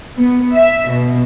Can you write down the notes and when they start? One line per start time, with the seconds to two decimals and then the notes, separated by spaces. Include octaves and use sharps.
0.17 B3
0.53 E5
0.91 B2